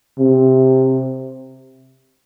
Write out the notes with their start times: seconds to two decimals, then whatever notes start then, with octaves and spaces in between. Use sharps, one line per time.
0.19 C3